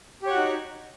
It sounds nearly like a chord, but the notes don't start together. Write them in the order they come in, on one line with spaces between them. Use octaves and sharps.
G4 C#5 F#5 F#4 D#4